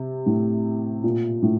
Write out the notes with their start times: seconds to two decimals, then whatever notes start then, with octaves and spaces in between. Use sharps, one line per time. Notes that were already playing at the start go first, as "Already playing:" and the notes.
Already playing: C3
0.26 A2
1.04 A#2
1.42 A2